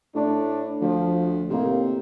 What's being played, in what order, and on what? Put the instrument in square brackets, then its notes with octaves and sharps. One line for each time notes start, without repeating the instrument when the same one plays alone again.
[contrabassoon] A2 [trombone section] D4
[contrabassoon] D2 [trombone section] F3
[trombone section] A2 D#3 A#3 [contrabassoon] C3